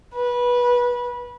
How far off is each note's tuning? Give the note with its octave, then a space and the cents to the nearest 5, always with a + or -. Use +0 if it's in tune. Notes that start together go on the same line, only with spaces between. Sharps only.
B4 -20